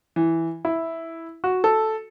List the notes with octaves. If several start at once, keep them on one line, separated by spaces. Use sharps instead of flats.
E3
E4
F#4
A4